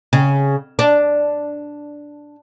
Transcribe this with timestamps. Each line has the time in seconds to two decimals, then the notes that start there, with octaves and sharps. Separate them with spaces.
0.13 C#3
0.79 D4